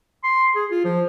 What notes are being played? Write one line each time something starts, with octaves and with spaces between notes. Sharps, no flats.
C6
G#4
F4
F3